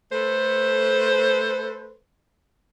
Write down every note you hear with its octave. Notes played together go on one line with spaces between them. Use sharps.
A3 A4 B4 C5